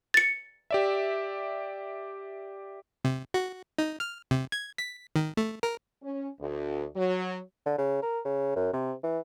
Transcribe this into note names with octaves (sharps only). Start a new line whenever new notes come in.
A6 C#7
G4 D5 E5
C3
F#4
D#4
F6
C3
G#6
B6
D#3
A3
A#4
C#4
D2
F#3
D3
C#3
A#4
C#3
F#2
C3
E3